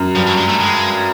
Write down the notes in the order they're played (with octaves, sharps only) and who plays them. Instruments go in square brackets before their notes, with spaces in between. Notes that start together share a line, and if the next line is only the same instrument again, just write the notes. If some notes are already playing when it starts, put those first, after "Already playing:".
Already playing: [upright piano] F#2
[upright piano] G2 [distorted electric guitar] F3
[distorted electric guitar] F#3
G#3
A3
G#3